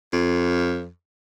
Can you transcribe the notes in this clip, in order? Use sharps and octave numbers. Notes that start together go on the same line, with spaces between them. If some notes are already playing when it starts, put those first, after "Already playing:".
F2